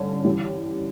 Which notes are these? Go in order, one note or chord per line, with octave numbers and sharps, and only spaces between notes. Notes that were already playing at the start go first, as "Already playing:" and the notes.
Already playing: G2 D3 C#4
E3 G3 C#4